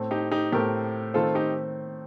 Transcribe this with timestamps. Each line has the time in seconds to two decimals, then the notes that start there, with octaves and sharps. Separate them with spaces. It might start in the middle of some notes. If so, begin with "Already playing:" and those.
Already playing: A2 A3 C4
0.11 D#4 G4
0.31 D#4 G4
0.52 A2 A3 C4 G4 A#4
1.14 D#3 A3 C4 F4 A4
1.35 D#4 G4